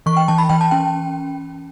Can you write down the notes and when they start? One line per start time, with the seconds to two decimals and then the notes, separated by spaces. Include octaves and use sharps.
0.06 E3 C#6
0.17 G5
0.28 E3 A5
0.38 B5
0.49 E3 G5
0.61 A5
0.71 C#4 G5